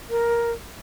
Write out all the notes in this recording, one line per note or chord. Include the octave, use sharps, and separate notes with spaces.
A#4